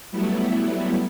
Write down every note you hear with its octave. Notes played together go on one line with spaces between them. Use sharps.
F#3 G3 A3 B3 E4